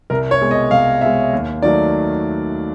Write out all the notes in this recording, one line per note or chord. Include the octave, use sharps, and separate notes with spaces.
C2 A#4
C#5
B2 G#3
D#5
C2 F5
B2 G#3 E5
D#2
D#3 F#3 A3 D5